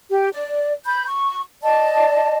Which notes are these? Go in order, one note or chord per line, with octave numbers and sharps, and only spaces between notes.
G4
D5
B5 G6
C#6
D5 D#5 A5